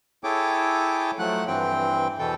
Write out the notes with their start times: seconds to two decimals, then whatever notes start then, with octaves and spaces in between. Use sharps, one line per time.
0.24 E4 G#4 A4 C#5 G5 D6
1.19 F3 F#3 A3 F#5 F#6
1.48 G2 E3 C4 G5
2.19 E2 B2 E3 A4 G5